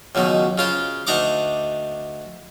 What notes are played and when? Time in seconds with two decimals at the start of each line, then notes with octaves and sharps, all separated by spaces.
0.15 C#2 F#2 B2 D#3
0.58 C#3 F4 C5
1.07 D2 D4 D#4 D#5 D6